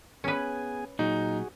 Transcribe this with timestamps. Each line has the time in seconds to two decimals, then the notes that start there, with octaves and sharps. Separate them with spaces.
0.24 B3 C#4 G#4 B4 G#5
0.99 A#2 F#3 D#4 F#4 G#4